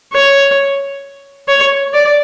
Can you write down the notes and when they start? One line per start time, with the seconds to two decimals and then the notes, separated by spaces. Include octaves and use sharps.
0.13 C#5
1.48 C#5
1.93 D5